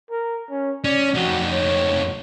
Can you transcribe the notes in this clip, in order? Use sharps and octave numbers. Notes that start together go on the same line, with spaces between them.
A#4
C#4
C#4 D5
F2 D#4 F#4
C#5